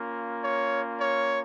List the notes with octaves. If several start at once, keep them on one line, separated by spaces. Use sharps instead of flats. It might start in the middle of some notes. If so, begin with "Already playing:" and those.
Already playing: A#3 C#4 F4
C#5
C#5